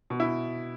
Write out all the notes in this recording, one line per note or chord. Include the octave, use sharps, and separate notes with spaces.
B2
E4